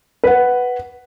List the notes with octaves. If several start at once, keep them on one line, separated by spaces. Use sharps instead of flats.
B4 F#5